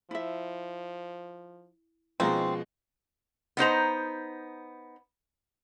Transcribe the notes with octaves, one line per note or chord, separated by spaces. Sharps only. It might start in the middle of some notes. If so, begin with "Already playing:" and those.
F3 E4 E5
B2 F3 G#3 C4 C#4 D#4 F5 A#5
B3 D#4 C5 A#5